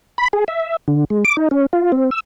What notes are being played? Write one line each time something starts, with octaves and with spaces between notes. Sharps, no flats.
B5
G#4
E5
D3
G#3
D6
D#4
C#4
F4
C4
E6